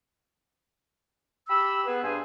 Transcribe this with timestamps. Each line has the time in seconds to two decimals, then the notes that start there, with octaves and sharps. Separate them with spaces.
1.49 G4 B5 E6
1.87 B3 G#4 B4
2.04 G2 D4 G#4 C5 G#5